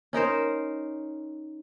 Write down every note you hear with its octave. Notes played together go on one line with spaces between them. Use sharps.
C#4 D#4 A#4 C5